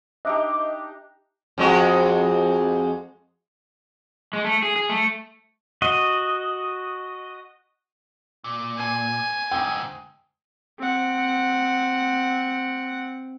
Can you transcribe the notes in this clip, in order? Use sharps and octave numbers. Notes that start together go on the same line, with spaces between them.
D4 D#4 G4 D#5 E5 D6
F2 G#3 F#4
G#3
A3
G#4
G#4
A3
F#4 D#5
A#2
G#5
G#2 D3 G5
C4 F#5